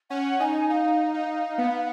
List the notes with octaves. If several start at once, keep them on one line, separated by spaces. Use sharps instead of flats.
C#4 F#5
D#4 G#5
D#4 F5
D#4
B3